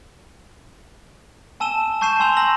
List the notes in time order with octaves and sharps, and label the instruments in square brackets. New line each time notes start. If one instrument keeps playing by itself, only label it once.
[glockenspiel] G#5 A5 E6 D#7 E7 G7
A5 C#6 G6 C7 D#7 E7
G#5 C6 E6 G6 F7
G#5 A#5 E6 A#6 F#7